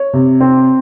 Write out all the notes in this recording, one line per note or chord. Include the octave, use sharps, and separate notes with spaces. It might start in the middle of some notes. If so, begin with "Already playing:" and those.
Already playing: C#5
C3
C4